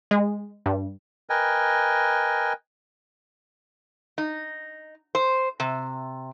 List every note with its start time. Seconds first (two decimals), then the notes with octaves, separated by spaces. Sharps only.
0.11 G#3
0.66 G2
1.30 A#4 B4 D#5 G5 G#5
4.18 D#4
5.15 C5
5.60 C3